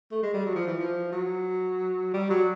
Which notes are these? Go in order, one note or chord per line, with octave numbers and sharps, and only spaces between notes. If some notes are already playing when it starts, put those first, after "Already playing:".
A3
G#3
G3
F#3
F3
E3
F3
F#3
G3
F#3